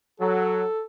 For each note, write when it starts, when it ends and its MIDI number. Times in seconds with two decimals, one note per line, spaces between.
0.20 0.63 54
0.20 0.82 69